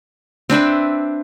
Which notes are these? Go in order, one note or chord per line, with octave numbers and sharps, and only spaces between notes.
C4 D4 B4 E5